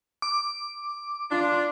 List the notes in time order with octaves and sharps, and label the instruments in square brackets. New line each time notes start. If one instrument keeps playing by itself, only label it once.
[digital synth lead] D6
[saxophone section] D4 [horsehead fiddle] F4